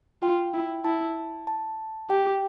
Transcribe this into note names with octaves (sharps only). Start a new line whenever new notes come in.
F4 G5
E4
E4 A5
A5
G4 G5